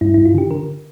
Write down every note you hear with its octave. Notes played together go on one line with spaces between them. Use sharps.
G2 E4
G2 E4
F4
D3 G4
D3 A#4